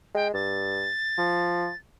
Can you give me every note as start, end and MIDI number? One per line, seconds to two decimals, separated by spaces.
0.15 0.29 56
0.15 0.27 79
0.33 0.89 43
0.33 1.76 93
1.18 1.68 53